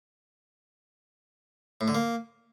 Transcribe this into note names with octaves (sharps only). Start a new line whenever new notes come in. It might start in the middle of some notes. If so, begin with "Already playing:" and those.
A2
D3
A#3